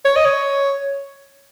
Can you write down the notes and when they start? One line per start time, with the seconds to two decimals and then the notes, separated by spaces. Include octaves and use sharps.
0.05 C#5
0.16 D#5
0.25 C#5